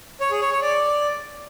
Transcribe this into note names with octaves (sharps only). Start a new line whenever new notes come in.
C#5
G#4
C#5
C#5
D5